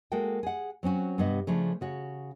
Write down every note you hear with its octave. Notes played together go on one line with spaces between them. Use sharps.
G#3 A#3 F#4 A4 G5
G#4 F#5
F#3 C4 C#4 F#4
G2 C3 B3 F#4 D#5
C#3 F3 A3 D4
C#3 F#4 C#5